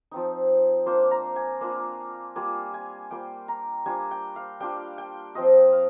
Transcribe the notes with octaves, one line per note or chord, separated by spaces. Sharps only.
F3 C4 D#4
A#3 D4 F4 C5
A#5
G#5
A#3 D4 F4
G3 A#3 F4 G#5
G#5
G3 A#3 F4 G5
A#5
G3 D4 F4 G#5
G5
F5
G3 D4 F4 G5
G5
F3 C4 F4 D#5
F5